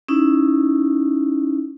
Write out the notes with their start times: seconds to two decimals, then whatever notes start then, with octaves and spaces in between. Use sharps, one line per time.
0.08 C#4 D#4 E4